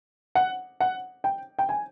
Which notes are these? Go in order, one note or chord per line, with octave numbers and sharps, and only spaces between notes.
F#5
F#5
G5
G5
G#5